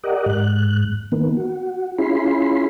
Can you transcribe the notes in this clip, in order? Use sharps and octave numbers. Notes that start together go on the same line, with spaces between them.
G4 A#4 D5 D#5 F#5
G#2 F#6
D#3 A#3 B3
F#4
C#4 E4 F4 G#4 B5 C6